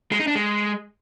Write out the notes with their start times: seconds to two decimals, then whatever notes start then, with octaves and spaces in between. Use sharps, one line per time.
0.12 G#3
0.20 D#4
0.27 D4
0.35 G#3